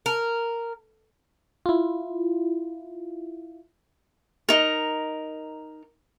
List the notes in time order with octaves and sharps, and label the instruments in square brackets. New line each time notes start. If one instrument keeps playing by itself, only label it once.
[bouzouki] A#4
[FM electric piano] E4 F4
[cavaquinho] D#4 A#4